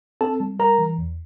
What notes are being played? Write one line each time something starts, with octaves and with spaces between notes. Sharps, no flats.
C4 A4 A5
G3
G3 A#4 A#5
E3
E2